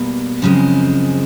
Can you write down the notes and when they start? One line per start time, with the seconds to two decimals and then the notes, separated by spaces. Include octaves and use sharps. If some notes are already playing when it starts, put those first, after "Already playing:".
Already playing: B2 G3 A#3
0.42 F#2 C#3 F3 G#3 C4